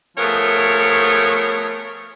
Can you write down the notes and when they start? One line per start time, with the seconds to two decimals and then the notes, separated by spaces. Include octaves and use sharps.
0.17 F3 A3 B3 G#4 A#4 C#5